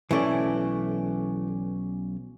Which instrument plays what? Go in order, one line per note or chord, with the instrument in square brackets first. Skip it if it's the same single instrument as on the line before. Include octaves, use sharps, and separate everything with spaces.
[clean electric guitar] B1 C#4 D5 [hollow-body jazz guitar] E3 A3